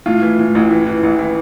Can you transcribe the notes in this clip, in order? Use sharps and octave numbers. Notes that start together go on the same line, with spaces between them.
A2 F4
E3
A2
A1
E3
E3
A1
E3